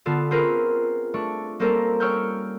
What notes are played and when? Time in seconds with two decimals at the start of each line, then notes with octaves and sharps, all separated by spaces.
0.06 D3 B3 F4 A4
0.31 C4 C#4 F4 G#4 A#4 B4
1.14 A3 D4 C#6
1.59 G3 A#3 C4 C#4 A4 A#4
2.00 C#5 G5 C#6 E6 F6 G6